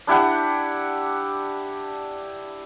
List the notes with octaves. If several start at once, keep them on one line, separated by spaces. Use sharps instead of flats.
D4 E4 G4 F#5